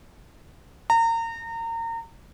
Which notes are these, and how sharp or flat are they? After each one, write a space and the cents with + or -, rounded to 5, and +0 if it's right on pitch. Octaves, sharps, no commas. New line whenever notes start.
A#5 -30